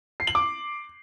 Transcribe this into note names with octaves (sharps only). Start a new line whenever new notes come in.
C7
F#7
D6